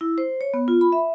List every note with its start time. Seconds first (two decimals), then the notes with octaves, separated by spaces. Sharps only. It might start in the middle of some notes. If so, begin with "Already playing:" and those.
0.01 E4
0.18 C5
0.41 C#5
0.54 B3
0.68 F4
0.81 B5
0.92 E5